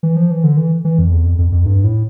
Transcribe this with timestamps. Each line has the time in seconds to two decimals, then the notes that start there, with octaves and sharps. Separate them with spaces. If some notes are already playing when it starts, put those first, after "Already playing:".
0.03 E3
0.16 F3
0.31 E3
0.44 D3
0.57 E3
0.85 E3
0.99 F2
1.12 E2
1.25 F2
1.38 F2
1.52 F2
1.66 G2
1.84 A2